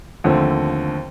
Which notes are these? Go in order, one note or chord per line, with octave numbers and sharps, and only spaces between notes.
D#2 D3 F3 A3 C4